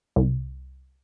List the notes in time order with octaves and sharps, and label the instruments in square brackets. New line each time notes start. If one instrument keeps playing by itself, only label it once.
[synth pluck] C2